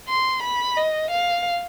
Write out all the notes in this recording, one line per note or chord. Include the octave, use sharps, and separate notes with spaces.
C6
B5
D#5
F5